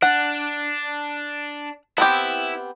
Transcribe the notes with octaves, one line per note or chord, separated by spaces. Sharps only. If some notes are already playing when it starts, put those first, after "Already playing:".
D4 F#5
B3 C4 E4 G4